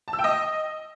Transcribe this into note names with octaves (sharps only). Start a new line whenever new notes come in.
A5
E6
G5
D#5